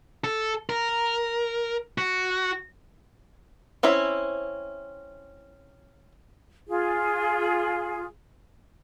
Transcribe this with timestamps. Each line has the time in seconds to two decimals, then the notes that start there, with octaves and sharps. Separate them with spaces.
0.24 A4
0.69 A#4
1.98 F#4
3.83 C4 C#4 E4 E5
6.68 F4 G#4